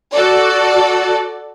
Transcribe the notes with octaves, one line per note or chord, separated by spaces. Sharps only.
F#4 A4 D5